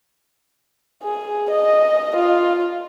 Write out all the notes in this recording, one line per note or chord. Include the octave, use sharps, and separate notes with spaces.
G#4
D#5
F4